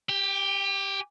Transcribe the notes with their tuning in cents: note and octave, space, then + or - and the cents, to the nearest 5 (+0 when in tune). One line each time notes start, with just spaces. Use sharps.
G4 +0 G5 +35